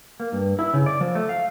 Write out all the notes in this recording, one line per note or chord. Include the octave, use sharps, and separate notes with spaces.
A#3
G2
E4
C#3
D5
F3
A3
F5